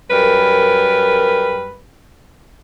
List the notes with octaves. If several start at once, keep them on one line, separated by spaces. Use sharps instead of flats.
F#2 G3 A#4 B4